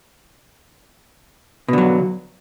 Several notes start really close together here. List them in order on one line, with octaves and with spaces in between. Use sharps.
B2 D3 F#3